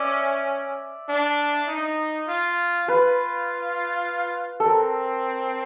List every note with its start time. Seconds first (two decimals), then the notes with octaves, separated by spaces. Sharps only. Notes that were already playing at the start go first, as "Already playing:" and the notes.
Already playing: C#4 D5 E5
1.09 D4
1.69 D#4
2.28 F4
2.88 F4 B4
4.60 A4
4.66 C4 A#4